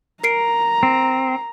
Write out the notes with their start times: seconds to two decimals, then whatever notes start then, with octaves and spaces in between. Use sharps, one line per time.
0.24 A#4 A#5 C7 D7
0.83 C4